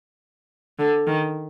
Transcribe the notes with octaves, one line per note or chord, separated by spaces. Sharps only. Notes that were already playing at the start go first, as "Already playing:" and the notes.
D3
D#3